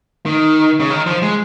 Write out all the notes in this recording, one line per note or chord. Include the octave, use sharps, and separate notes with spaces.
D#3
C#3
D#3
F3
G#3